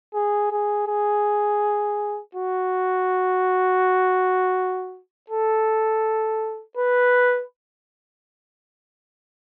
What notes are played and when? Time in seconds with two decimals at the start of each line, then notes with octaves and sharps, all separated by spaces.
0.14 G#4
0.51 G#4
0.87 G#4
2.35 F#4
5.30 A4
6.77 B4